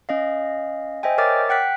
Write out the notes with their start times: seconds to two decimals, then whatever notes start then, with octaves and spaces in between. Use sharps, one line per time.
0.09 C#4 D#5 F5
1.03 C5 D#5 E5 G5 G#5
1.18 A#4 C#5 E5 D6 F6 A6
1.49 F#5 G5 F#6 B6